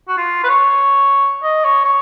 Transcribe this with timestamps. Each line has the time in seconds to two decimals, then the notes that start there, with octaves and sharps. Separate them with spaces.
0.08 F#4
0.17 F4
0.44 B4
0.49 C#5
1.43 D#5
1.64 C#5
1.85 C#5